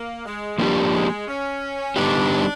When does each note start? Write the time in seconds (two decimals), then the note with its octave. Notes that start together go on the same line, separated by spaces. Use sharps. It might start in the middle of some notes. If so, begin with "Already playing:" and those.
Already playing: A#3
0.25 G#3
0.58 F3 G3 A#3 D4 G4
0.93 G#3
1.27 C#4
1.96 D3 G3 B3 D4 D#4 G4